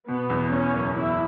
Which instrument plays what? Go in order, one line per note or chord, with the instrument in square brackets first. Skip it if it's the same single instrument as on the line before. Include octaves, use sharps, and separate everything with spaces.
[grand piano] B2 [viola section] B3
[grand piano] E2
[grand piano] E2 [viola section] C#4
[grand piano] F#1
[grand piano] E2 [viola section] E4